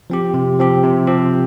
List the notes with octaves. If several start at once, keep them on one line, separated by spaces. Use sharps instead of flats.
F3 C4 G4
C3
F3 C4 G4
C3
F3 C4 G4